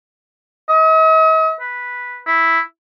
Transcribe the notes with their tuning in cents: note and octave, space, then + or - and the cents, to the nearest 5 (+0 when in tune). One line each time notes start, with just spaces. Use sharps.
D#5 +45
B4 -5
E4 -5